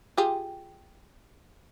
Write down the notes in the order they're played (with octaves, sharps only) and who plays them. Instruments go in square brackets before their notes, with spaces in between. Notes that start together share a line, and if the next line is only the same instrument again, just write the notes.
[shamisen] F4 G4 G#4